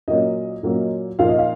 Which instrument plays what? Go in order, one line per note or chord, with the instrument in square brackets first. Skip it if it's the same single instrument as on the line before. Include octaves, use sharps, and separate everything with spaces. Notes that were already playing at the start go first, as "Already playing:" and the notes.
[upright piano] A#2 F#3 A#3 C#4 D#5
A#2 F#3 A#3 C#4
A#2 F3 A#3 D#4 F5
D#5
F5